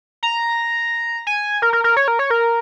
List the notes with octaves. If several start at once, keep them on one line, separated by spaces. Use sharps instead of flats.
A#5
G#5
A#4
A#4
A#4
C#5
A#4
C#5
A#4